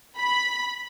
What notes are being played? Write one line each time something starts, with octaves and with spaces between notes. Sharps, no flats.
B5